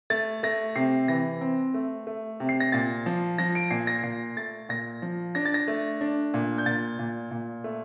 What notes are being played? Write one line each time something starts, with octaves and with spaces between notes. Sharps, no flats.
A3 A6
A3 A#6
C3 C7
E3 A#6
C4
A3
A3
C3
C7
A#6
A#2 A6
F3
F3 A#6
D7
A#2 C7
A#6
A#2 C7
A3 A6
A#2 A#6
F3
D4 A#6
A6
A#6
A3
D4
A#2
G6
A#2 A6
A#2
A#2
A3